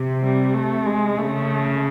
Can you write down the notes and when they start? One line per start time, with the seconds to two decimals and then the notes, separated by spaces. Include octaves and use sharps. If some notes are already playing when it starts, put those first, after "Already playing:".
Already playing: C3
0.23 G3
0.54 A3
0.86 G#3
1.18 C#3 A3